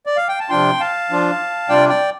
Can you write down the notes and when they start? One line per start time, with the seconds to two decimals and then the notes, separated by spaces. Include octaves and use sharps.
0.06 D5
0.17 F5
0.29 G5
0.40 A5
0.49 C3 F3 D4 F4 G5 C6
0.80 F5 A5
1.10 F3 D4 F4
1.69 C3 G3 D4 F4 D5 G5
1.89 D5 G5